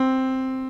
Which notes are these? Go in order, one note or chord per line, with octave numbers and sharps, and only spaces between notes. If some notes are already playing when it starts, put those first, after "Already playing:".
Already playing: C4